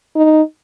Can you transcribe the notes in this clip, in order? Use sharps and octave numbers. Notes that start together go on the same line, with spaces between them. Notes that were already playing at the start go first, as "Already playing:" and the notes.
D#4